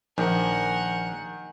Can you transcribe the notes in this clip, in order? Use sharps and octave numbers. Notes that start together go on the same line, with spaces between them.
A#1 D#3 A#4 F#5 G#5